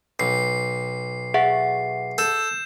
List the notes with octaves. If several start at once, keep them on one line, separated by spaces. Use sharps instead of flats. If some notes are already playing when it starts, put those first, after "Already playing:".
B1 C7
G#4 E5 F#5
A4 G6 E7